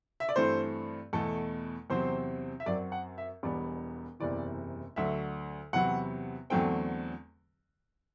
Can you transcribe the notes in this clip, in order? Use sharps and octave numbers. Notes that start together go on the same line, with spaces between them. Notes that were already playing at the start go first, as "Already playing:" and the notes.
E5
D5
G2 E3 A3 C4 C5
E2 B2 A3 A4
E2 C3 F#3 C4 C5
E5
F#2 F#3 C4 D5
F#5
E5
E1 E2 B2 G3 B3 D5
F#1 E2 C3 E3 D5
D2 D3 F#3 E5
E2 C3 F#3 B3 F#5
E2 D3 F#3 A3 C4 G5